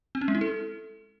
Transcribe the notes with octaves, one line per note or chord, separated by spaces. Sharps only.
C4
C#4
G#3
E4
A4